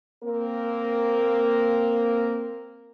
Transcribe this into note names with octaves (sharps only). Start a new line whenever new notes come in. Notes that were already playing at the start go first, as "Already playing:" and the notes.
A#3 C4 A#4